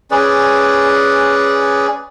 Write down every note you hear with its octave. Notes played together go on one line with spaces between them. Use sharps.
C#4 G#4 B4 D5